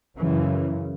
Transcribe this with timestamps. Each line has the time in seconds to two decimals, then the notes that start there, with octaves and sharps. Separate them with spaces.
0.19 F#2 C#3 E3